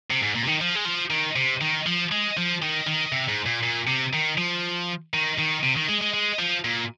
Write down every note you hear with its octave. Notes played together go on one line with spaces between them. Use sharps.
C3
G#2
A#2
C3
D#3
F3
G#3
F3
D#3
C3
D#3
F3
G#3
F3
D#3
D#3
C3
G#2
A#2
A#2
C3
D#3
F3
D#3
D#3
C3
D#3
G#3
G#3
G#3
F3
A#2